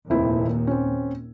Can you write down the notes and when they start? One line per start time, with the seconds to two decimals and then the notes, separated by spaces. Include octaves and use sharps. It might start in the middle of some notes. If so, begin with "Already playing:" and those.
0.10 F1 D#2 A#2 C4 E4
0.67 C4 C#4